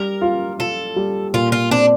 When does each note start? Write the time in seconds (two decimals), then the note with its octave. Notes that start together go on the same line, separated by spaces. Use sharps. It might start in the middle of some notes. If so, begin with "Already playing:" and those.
Already playing: G3 A#4
0.21 F4
0.59 F4 A4
0.96 G3
1.34 A#2 F4
1.52 F4
1.70 C4 D4